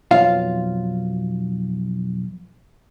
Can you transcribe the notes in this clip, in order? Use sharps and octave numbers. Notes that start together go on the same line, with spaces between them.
B1 F2 F4 F5